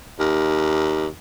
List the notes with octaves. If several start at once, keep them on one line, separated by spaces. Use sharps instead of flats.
D#2